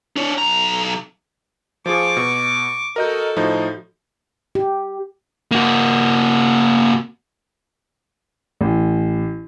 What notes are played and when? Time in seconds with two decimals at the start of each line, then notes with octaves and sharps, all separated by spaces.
0.16 D4 C#5
0.38 B1 A#5
1.86 F3 F4 G#4 C#6 D6
2.17 B2
2.96 F#4 A4 A#4 D#5 G6
3.36 A2 F3 D#4
4.55 G4
5.51 A#3 F#4
8.61 A1